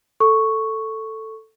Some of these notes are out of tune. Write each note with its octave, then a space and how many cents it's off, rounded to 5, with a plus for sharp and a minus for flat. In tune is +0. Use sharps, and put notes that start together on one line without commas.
A4 +5 C#6 +0